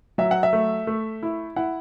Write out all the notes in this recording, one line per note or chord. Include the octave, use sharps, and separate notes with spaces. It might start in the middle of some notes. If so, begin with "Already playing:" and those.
F#3 E5
F#5
E5
A3
A3
E4
E4 F#5